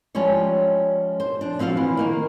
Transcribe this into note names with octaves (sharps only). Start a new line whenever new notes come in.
F3 G3 G#3 C#4 C#5
C5
F3 D4
F3 C4 F4 F#4 F5
E3
D#3 A#3 A#4